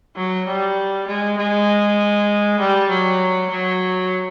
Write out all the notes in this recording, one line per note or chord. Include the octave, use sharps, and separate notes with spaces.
F#3
G3
G#3
G#3
G3
F#3
F#3